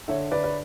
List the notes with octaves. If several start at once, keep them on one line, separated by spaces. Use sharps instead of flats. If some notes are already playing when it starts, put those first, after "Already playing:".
D3 C#5 E5
D3 B4 D5
B4